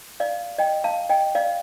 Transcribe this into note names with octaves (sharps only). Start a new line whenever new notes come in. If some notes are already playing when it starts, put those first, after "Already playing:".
D5 F5
D#5 G5
F5 A5
D#5 G5
D5 F5